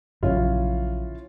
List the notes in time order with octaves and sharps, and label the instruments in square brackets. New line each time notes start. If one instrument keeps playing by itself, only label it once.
[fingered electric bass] A#1 C#3 F#3 [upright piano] C#4 E4 F4